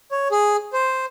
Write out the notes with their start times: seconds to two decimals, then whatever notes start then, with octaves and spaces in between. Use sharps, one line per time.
0.11 C#5
0.31 G#4
0.73 C5